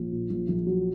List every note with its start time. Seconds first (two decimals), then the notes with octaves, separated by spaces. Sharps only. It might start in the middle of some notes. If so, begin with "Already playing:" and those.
Already playing: A#1
0.12 A#2
0.30 A#1
0.49 A#1
0.66 F#3